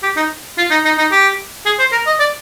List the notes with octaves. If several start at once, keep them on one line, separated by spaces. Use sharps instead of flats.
G4
D#4
F4
D#4
D#4
D#4
G4
G#4
C5
A#4
D#5
D5